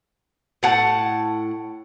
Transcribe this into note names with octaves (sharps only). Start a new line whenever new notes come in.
A2 F#5 A5